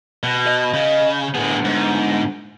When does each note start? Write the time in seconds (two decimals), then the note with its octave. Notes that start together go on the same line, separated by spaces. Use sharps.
0.23 B2
0.47 D#5
0.74 C#3
1.35 A2 D3 B3 G#4
1.65 G#2